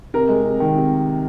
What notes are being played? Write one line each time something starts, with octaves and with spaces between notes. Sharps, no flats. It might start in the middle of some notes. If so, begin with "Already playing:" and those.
C3 A#4
G#3
C3
D#3
C3